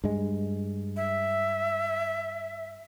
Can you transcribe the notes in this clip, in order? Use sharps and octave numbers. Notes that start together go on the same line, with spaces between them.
G2 G#3
E5